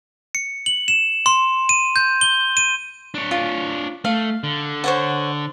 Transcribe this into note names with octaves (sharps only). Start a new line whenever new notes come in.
C#7
F#7
E7
C6
D#7
G6
G7
D#7
D4 C#5
F4
A3 F5
D3
C5 C#5 F#5